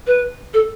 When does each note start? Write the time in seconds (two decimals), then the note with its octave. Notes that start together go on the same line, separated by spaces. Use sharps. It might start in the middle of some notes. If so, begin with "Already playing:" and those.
0.07 B4
0.54 A4